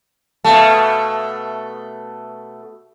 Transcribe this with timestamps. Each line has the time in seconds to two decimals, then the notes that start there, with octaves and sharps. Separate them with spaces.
0.45 B2 A3 E5 F5 A5